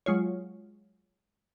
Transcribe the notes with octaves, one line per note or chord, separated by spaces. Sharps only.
F#3 G#3 F4 C#5